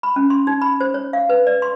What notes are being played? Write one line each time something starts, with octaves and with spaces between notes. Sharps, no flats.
B5
C#4
C6
D#4
B5
C5
C#5
F5
B4
D5
C6